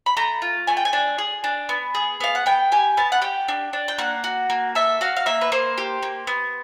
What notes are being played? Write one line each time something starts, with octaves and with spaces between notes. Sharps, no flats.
B5
A3 A#5
F4
A3 G#5
G5
G#5
D4
G#4
D4
B3
G#4
B3 F5
F#5
B3 G5
G4 G#5
B3 A5
F#5
G4 G5
D4
D4
G5
A#3 F#5
F#4
A#3
A4 E5
F#4 F5
F5
A#3 E5
B4
A#3 C5
G4
A#3
B3